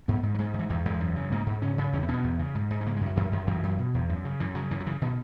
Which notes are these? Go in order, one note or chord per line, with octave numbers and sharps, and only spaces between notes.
G#2 B3
G#2
F#3
G#2 G#3
G#2 D#3
E3
E2 E3
E2 G#3
F#2
C#3
G#2 A#3
G#2
C#3 C#4
C#3
E2 C#4
B3
B2 C#4
B3
E2
C#3
G#2
G#2
G#3
C#3 A#3
G#3
F#2 F#3
F#2 E3
F#2 D#3
F#2 E3
F#2
B2
E2
F#2
C#3
F#2 E3
C#3 F#3
F#2 E3
F#3
C#3 E3
B2 D#3